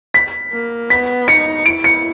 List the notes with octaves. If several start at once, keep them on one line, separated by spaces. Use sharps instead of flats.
B6
A#3
B3 B6
D#4 C#7
E4 D7
C#7